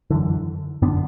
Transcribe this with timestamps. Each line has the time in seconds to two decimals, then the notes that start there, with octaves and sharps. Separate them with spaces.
0.10 F#2 D3 E3
0.82 F#2 B3 D4
0.86 D3